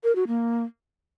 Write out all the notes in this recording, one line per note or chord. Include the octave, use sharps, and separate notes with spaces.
A#4
F#4
A#3